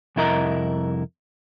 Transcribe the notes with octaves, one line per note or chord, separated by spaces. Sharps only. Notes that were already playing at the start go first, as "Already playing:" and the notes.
C2 F2 E4 A#4 D#5 A#5